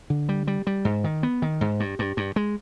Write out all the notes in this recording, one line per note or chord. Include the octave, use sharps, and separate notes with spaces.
D3
G3
G3
G3
G#2
D#3
B3
D#3
G#2
G2
G2
G2
G#3